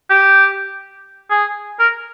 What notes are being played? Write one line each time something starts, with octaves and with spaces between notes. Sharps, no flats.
G4
G#4
A#4